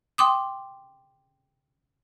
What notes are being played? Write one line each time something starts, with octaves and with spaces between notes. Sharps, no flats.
G5 C6 D6 D#6